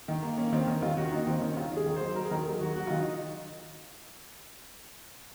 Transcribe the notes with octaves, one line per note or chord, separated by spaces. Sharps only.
D#3
A#3
A#3 C#4
D#3 C4
D#3 C#4
D#3 F4
D#3 F#4
A#3 D#4
D#3 C4
D#3 C#4
D#3 F4
D#3 G#4
D#3
F#3 C5
F#3 A#4
G#4
D#3 A#4
F#3 G#4
D#3 F#4
F#3 F#4
D#3 F4
D#4